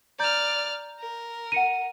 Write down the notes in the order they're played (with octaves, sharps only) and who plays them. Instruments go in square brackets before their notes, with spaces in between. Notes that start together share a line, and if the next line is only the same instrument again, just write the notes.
[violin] D5 F6 [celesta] A#5 G6
[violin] A#4
[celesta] F#5 C#7 D#7